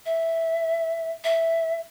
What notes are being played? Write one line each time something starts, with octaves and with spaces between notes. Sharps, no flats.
E5
E5